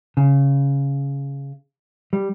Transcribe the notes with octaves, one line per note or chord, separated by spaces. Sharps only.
C#3
G3